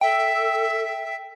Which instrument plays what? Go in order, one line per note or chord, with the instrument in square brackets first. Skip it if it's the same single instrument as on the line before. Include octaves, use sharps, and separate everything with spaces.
[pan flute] A4 [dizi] E5 [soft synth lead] G5